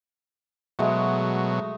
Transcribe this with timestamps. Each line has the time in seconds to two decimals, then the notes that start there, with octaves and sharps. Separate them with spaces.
0.79 B2 F#3 G#3 A3